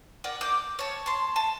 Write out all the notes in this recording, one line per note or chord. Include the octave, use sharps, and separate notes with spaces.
A#4 D5 F#5
D6 G6
C#5 A5
A5 C6
A5